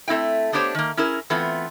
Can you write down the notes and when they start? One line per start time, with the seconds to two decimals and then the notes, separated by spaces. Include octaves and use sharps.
0.08 A3 C4 E4 E5 G5
0.52 A3 B3 D4 G4 C5 C#5
0.75 D#3 A#3
0.97 C#4 E4 G#4 A#4
1.30 E3 A3 B3 C4 F4